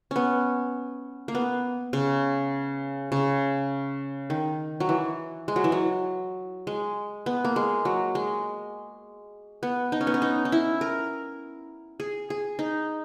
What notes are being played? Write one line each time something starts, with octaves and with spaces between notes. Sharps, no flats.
B3 C#4
A#3
B3
C#3
C#3
D#3
F#3
E3
G#3
F#3
E3
F#3
G#3
B3
A#3
G#3
F#3
G#3
B3
D#4
C#4
B3
C#4
D#4
D#4
E4
A#4
G#4
G#4
D#4